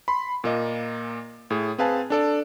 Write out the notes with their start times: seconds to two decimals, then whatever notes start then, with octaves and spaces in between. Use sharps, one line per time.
0.08 B5 C6
0.44 A#2 A#3 D#5
1.50 A2 G#4
1.78 C4 G#4 B4 F5 G#5 A5
2.10 D4 A4 D5